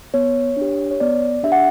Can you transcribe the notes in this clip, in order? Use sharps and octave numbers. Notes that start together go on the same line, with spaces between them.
B3 C#5
D4 G4
C#5
B3 D5
D4 G4 E5
F#5